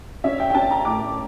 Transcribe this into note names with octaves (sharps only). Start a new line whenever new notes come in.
C#4 E5
G5
G5
C#4 A5
A#5
A2 D6